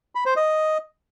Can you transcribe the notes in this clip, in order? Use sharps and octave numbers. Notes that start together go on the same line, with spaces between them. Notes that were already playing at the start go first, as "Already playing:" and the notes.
B5
C5
D#5